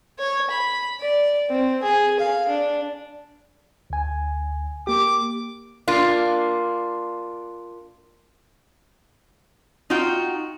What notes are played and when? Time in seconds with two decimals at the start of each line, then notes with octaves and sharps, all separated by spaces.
0.19 C#5
0.50 B5
1.01 D5
1.50 C4
1.82 G#4
2.20 F5
2.48 D4
3.90 D2 G#5
4.87 A#3 G4 D6
5.88 A#3 D4 F4
9.90 D#4 F4 F#4 G5